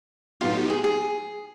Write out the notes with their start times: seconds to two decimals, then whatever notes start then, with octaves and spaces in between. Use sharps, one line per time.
0.41 A2 F#3 B3 D#4 F4 G4
0.70 G#4
0.84 G#4